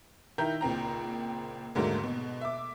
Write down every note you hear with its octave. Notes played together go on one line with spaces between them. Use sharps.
D#3 E4 E5 A#5 G6
C#2 A#2 C4 A#5
D#2 G#2 D3 F#3 A3 A#3
B2
E5 D6